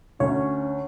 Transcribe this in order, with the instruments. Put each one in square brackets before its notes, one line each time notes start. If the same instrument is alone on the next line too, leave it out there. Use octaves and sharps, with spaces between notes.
[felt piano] D2 [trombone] C#4 [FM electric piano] C#5